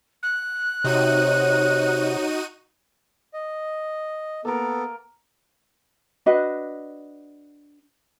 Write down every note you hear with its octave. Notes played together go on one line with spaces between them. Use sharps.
F#6
C3 D#4 F#4 C#5 D#7
D#5
A#3 B3 A4 A#4
D4 F#4 B4 D#5